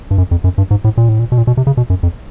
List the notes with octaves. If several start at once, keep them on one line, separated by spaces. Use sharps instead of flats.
G2
F#2
F2
F#2
G2
G#2
A2
A#2
A2
A#2
B2
A#2
B2
C3
C#3
B2
F#2
F2